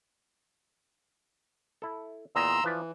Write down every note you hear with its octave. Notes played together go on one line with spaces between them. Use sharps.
E4 A4
E2 A#2 D#5 A#5 C6 E6
E3 F3 B4 D5